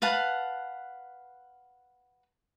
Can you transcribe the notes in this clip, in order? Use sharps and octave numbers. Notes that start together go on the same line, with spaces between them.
B4 F5 F#5 A5